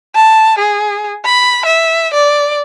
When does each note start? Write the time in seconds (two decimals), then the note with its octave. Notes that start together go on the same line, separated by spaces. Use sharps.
0.15 A5
0.58 G#4
1.25 B5
1.65 E5
2.13 D5